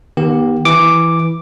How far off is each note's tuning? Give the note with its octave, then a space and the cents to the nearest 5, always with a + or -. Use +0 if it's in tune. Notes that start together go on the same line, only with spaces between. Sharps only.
D#3 +0 B3 -40 G4 +0
E3 +0 D6 +0